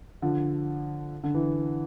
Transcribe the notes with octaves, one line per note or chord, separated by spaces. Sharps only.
D3 F3
D3
E3